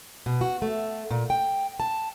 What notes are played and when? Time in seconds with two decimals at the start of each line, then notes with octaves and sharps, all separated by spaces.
0.26 B2
0.41 F#4
0.62 A3
1.11 A#2
1.30 G5
1.80 A5